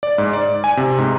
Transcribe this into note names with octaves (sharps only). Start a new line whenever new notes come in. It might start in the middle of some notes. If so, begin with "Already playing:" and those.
D5
G#2
D5
G#5
C3
G#2